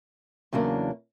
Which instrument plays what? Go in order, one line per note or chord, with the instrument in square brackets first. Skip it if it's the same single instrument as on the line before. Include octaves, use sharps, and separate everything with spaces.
[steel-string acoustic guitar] E2 C#3 F#3 A#3 D4